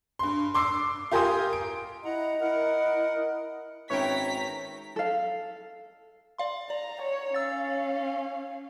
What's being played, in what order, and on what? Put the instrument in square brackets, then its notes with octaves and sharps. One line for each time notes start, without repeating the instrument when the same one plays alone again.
[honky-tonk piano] G2 C6
C6 D6 E6 C7
F4 G4 A#4 G#5 C6 D#6
D7
[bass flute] E4 [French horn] D#5 [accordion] F#5 A#5
[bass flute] E4 [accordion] A#4 F#5
[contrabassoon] G#1 [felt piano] C#4 B4 E5 [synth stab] C#5 G5 [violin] A#5 B6
[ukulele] A4 F5
[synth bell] D5 F5 C6
[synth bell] D5 [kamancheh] A#5
[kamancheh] C#5
[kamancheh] C#4 F5 [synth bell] E6 A6